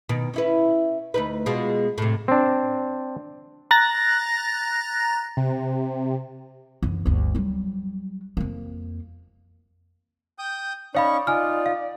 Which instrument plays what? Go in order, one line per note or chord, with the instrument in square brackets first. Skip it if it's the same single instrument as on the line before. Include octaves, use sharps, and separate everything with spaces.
[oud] B2 D#3
C#4 E4 B4
D2 D#4 B4
B2 G#3 F4
A2 C3
[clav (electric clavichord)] C4 D4
[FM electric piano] A#5 F#6 A6 A#6
[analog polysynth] C3
[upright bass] F#2 E3
G1 D2
F#3 G3
F2 A#3
[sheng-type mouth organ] G5 D#6 G6
[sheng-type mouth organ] C#4 D#4 C#6 [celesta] C#5 F5 B5 [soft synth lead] D5
[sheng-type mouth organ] D#4 F4 [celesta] G#5 F6
[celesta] F5